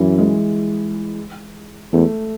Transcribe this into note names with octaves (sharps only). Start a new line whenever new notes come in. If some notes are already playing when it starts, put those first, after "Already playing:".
Already playing: F#2 E3
G#3
E2 A3